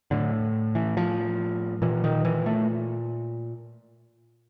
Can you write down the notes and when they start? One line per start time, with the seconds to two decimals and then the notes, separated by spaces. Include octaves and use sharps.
0.11 A2 D3
0.75 E3
0.97 F3
1.82 A#2 E3
2.04 D#3
2.25 E3
2.46 A3